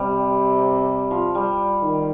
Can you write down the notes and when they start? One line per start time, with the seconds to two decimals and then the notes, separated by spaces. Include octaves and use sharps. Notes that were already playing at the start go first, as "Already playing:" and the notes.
Already playing: C3 G3
1.11 F3
1.35 G3
1.83 D#3